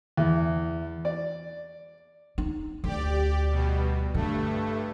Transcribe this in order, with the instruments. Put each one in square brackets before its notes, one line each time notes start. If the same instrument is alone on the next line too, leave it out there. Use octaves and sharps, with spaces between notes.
[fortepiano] E2
D5
[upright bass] D#4
[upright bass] D2 [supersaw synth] G4 D5
[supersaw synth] B2 G3
[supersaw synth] G2 A3 [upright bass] D3